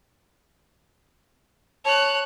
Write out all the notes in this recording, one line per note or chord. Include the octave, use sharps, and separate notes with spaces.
C#5 A5 F#6